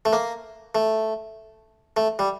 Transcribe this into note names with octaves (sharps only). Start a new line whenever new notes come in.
A3
A#3
A3
A3
G3